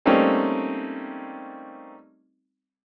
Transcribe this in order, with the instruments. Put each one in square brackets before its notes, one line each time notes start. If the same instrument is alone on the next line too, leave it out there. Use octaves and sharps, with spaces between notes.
[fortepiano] G3 A3 A#3 C4 C#4 D#4